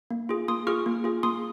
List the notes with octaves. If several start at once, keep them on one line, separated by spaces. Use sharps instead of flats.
A#3
F4 G#4
A#3 C6 D#6
F4 G#4 C#6 F6
A#3
F4 G#4
A#3 C6 D#6